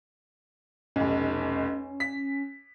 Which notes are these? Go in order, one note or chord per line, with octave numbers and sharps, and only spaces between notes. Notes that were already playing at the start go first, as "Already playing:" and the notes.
F1 B1 C#4
B6